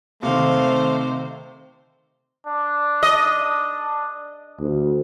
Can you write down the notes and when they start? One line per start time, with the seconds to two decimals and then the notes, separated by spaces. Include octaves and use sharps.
0.23 C3 D#3 A3 C5 F5
2.47 D4
3.03 D#5
4.61 D2